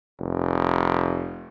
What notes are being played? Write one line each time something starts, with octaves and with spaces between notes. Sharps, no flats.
F1